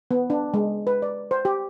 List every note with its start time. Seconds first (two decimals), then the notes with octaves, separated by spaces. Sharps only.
0.11 B3
0.30 D4
0.54 G#3
0.87 B4
1.02 D5
1.31 C5
1.45 G4